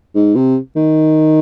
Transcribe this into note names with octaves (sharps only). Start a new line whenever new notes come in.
G#2
C3
D#3